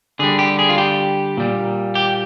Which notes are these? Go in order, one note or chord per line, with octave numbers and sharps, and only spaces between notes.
D3 G3 G#4
G4
G#4
F4
G4
A#2 G3
G4